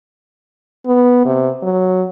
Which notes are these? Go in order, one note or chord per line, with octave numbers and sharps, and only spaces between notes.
B3
C3
F#3